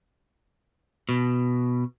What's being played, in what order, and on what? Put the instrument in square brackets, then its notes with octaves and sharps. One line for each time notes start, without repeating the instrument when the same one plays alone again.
[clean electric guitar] B2